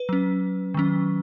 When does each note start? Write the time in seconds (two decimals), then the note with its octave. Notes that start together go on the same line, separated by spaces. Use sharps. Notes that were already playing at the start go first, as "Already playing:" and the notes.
Already playing: B4
0.09 F#3 C#4
0.74 D#3 F#3 C#4